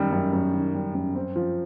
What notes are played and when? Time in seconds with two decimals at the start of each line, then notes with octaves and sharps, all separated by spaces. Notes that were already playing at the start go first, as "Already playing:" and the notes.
Already playing: F#2 D#3 G3
0.12 F#2
0.33 F#2
0.54 D#3
0.74 G3
0.95 F#2
1.15 C4
1.36 F3